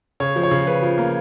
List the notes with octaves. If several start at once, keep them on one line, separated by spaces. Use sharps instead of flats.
C#3 C#5
F3
C#5
C#3
F3 B4
F3
A#3